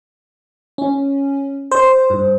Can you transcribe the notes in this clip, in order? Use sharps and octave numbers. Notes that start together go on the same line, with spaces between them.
C#4
C5
G2